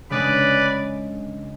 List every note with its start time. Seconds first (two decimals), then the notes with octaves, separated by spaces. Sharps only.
0.10 C#3 G#3 D4 B4 D5